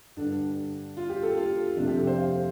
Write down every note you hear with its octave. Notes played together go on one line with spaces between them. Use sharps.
G2 D3 G3 D4
F4
G4
A4
F4
F2 C3 A3 D4
G4
A4
C5
F5